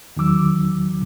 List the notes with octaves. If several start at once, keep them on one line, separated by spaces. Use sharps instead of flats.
E2 D#3 F#3 D6 E6